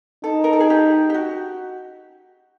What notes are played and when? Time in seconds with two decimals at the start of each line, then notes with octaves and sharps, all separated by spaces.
0.24 D#4 A4
0.44 A#4
0.53 A4
0.60 G#4
0.70 G4
1.10 G4
1.14 F#4